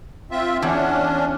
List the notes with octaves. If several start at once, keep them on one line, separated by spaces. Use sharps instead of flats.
C4 F4 E5
E2 C#4 D4